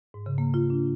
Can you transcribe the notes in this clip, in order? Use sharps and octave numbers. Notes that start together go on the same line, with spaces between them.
G#2
C#3
A#3
F4
D4